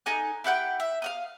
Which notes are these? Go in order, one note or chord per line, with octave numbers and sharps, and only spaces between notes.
D#4 A4 G#5 F#6
E4 G4 F#5 G5
E5
F5 F#5 D#6